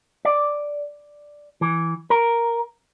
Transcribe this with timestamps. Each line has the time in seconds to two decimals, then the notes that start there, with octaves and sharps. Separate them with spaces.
0.25 D5
1.61 E3
2.10 A#4